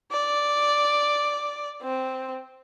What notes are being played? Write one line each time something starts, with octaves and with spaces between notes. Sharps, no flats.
D5
C4